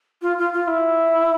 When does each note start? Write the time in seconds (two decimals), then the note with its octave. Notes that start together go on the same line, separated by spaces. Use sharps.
0.22 F4
0.38 F4
0.53 F4
0.67 E4